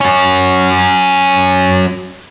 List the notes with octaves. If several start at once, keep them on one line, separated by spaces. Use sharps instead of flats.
F#3 C#4